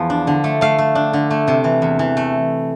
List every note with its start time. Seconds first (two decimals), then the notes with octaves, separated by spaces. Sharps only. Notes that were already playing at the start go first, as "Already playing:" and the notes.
Already playing: E2 F3
0.10 D4
0.27 D3
0.44 A3
0.61 A3 F5
0.78 A3
0.95 D4
1.13 D3
1.31 A3
1.48 C3
1.64 E3
1.82 E2
1.99 E3
2.17 A3